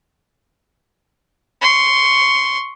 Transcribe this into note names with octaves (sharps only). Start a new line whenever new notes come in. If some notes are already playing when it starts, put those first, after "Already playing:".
C6 C#6